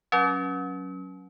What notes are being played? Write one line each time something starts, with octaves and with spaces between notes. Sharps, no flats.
F#3 C#4